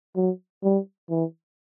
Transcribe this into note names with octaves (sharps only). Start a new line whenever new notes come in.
F#3
G3
E3